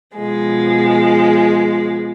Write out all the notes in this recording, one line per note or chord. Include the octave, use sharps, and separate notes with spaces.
B2 F3 G#3